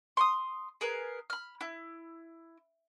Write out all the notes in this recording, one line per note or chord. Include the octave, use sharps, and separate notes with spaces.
C6 C#6 D#6
G#4 A#4 B4
B5 F6
E4